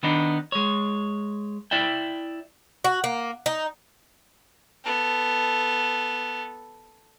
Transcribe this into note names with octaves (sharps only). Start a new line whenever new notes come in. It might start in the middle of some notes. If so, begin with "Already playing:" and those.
D#3 B3 D4 D#4
G#3 C#5
E4 D5 E5 G5
F#4
A#3
D#4
B3 A4